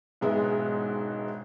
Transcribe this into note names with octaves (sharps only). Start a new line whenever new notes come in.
E1 G#2 G#3 B3 E5